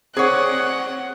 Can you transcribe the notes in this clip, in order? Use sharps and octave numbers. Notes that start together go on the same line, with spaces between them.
C4 G#4 C#5 D5 F#5